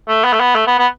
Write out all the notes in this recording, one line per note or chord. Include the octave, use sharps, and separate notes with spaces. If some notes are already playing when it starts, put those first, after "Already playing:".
A3
B3
A3
B3
A3
B3
B3